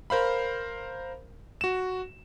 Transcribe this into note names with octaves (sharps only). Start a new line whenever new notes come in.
A#4 C5 F5 B5
F#4 E7